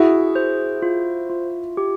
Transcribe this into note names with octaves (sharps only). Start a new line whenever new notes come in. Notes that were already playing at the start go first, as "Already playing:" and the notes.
Already playing: E4 F#4 G#4
C5
F4
F4
G4